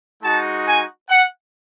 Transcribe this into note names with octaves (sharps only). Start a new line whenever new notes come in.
G#3 D#4 F#4 A5
G#5
F#5